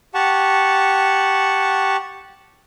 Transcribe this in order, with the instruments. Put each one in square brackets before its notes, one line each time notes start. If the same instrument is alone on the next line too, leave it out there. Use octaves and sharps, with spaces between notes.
[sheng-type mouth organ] G4 F#5 A5 C#6